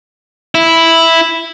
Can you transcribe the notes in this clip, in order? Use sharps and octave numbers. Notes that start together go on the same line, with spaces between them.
E4